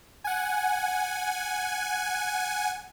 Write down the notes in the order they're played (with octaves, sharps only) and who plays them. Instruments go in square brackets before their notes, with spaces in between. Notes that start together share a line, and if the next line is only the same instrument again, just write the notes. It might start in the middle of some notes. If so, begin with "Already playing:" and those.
[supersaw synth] F#5 G#5